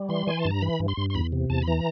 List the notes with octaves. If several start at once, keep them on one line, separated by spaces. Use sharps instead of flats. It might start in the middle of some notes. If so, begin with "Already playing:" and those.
Already playing: G3
E3 C6
E3 G#5
A5
G2
A#5
E3 B5
G2
C6
G2
C6
E2 B5
C3
E2 A5
B5
E3 A#5